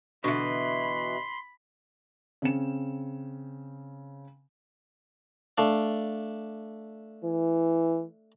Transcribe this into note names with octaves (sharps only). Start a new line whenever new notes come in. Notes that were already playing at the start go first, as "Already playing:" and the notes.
B2 D3 E3 B5 C6
C#3 C4 E7
A3 D4 F5
E3